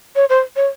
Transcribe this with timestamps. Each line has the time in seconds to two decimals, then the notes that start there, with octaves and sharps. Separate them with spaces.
0.16 C#5
0.30 C5
0.56 C#5